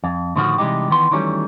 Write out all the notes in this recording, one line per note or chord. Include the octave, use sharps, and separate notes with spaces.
F2
A2 D3 D#3 F3 F#4
C3 E3 G3 G#3 D#4 G4
D#3 E3 B3 C6
D#3 E3 F#3 G3 A3 C#4